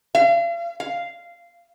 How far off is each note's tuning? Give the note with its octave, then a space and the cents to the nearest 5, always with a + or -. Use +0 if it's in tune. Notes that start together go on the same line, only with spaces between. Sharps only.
F5 -40
F5 -10